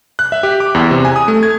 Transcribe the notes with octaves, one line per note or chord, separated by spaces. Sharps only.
F#6
E5
G4
D6
E2
C3
G#5
D#6
A3
G#6